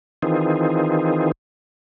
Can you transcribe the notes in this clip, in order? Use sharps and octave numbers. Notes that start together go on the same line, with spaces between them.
D#3 E3 C4 D#4 F4 G#4